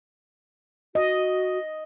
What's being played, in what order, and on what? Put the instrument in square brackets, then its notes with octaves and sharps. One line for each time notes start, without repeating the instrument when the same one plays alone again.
[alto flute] F#4 [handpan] D#5